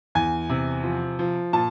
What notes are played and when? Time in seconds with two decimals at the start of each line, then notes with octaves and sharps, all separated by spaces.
0.15 E2 G#5
0.49 C3
0.83 F3
1.19 F3
1.53 A#2 A5